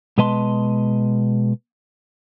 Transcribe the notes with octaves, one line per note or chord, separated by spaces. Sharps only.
B2 G#3 B4 D#5 A5 C6